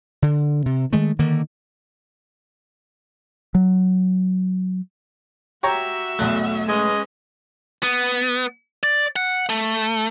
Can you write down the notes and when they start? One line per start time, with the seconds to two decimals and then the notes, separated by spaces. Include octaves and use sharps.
0.22 D3
0.66 C3
0.93 D#3 G#3 A3
1.19 D3 D#3 A#3
3.55 F#3
5.63 F#4 G4 C#5 E5 A#5
6.19 B1 E2 A3 F#6
6.68 G#3 C#4 B4 D#5
7.83 B3
8.83 D5
9.16 F#5
9.49 A3